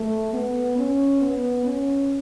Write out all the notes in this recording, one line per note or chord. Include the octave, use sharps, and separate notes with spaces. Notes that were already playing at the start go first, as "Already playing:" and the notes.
Already playing: A3
B3
C#4
B3
C#4